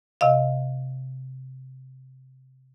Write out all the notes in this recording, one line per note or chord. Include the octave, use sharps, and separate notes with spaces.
C3 D#5 F5